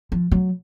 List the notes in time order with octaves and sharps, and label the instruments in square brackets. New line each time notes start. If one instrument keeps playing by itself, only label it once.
[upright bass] F3
F#3